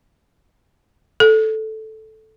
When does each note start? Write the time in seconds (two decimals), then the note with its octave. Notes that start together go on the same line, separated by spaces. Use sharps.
1.20 A4